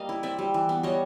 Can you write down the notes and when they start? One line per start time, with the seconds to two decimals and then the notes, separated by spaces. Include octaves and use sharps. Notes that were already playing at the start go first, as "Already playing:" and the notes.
Already playing: G3 A#3 D#5 F5
0.09 E4
0.23 C4 D5 E5
0.39 G3
0.54 E3
0.69 B3
0.83 G3 C#5 D#5